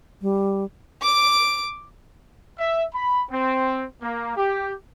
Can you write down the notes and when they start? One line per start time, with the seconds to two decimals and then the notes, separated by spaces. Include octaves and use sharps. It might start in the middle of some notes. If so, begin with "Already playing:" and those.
0.22 G3
1.01 D6 D7
2.59 E5
2.94 B5
3.31 C4
4.02 A#3
4.36 G4